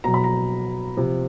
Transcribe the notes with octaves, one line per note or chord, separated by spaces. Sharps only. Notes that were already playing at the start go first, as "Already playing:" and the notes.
B2 F#3 A#5
B5
A#5
C3 F3